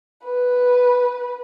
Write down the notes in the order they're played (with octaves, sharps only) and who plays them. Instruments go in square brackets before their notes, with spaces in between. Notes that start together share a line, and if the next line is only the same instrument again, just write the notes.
[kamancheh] B4